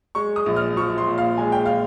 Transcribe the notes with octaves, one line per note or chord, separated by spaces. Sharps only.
G#3 C#6
D#6
A#1
F6
F3 C#6
C6
A#2
F5
G#3 G#5
G5
F5